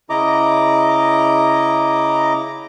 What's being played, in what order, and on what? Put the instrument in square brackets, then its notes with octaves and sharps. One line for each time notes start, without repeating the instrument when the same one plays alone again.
[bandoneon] C#3 E4 D#5 A#5 D6